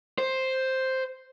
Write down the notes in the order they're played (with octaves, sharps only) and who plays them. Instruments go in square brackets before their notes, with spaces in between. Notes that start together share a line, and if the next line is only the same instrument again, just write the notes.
[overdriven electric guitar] C5